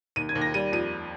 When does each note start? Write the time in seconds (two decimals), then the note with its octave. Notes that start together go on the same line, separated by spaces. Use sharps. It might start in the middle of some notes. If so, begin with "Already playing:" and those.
0.16 D#2 D#7
0.29 G#6
0.35 D#2
0.41 A#6
0.54 G3 D#7
0.73 F2 D#7